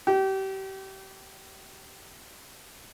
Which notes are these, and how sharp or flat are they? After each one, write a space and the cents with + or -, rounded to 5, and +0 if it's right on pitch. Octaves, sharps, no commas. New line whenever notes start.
G4 -30